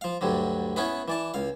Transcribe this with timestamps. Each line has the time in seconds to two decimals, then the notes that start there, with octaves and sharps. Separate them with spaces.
0.01 F3 F5
0.21 D2 G2 D3 F#3 G3
0.76 B3 C#4 E4 G#4 B4
1.08 E3 D5 A5
1.34 C#2 F5